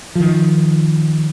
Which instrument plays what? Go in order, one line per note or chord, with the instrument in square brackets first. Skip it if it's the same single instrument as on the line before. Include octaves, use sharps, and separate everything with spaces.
[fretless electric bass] D#3 F3